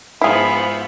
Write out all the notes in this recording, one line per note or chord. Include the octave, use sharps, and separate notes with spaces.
G#2 F3 B3 E4 G#4 E5 F5